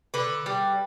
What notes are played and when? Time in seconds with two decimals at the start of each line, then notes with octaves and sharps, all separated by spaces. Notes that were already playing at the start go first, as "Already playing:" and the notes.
0.14 D3 B4
0.46 G3